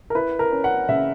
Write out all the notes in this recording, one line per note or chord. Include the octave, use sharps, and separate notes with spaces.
A#4
E4 B4
A#4
C#4
F#5
C#3 E5